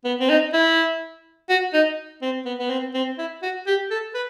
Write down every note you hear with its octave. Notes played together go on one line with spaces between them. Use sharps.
B3
C4
D#4
E4
F#4
D#4
C4
B3
B3
C4
C4
E4
F#4
G4
A4
B4